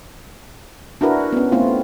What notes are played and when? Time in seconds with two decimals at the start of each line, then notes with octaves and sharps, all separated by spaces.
1.01 D4 E4 F#4 A#4 B4
1.33 B3 C#4
1.52 A3 B3 C4 E4 F4